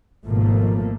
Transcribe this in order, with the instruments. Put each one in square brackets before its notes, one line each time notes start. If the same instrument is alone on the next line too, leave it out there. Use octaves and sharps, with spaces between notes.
[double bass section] G#1 B2 F3 A3 A#3